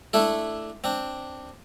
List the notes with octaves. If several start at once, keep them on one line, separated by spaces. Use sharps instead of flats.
A3 D4 E4 A4
C4 D4